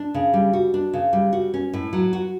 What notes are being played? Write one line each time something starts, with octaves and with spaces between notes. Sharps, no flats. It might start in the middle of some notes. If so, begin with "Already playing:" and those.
Already playing: D4
C#3
G3
F#4
D4
C#3
G3
F#4
C#4
A2
F#3
F#4